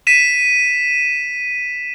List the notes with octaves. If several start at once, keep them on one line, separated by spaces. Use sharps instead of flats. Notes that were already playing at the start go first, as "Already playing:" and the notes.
B6 D#7 E7